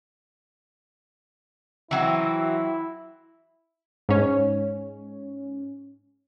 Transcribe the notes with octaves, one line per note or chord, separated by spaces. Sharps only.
E3 F#3 C4 E4
G#2 C#4